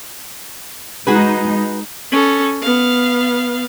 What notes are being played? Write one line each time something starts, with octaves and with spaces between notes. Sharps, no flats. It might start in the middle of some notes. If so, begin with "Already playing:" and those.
G#3 D#4 F#4 G#4 B4
C#4 A4
B3 F5